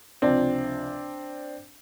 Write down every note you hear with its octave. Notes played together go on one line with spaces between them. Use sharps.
C#2 C3 F3 C4 D4